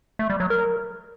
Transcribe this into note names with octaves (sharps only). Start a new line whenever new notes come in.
A3
G3
F#3
A#4